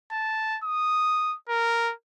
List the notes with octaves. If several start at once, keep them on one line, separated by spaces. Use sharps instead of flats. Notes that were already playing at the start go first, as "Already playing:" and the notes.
A5
D#6
A#4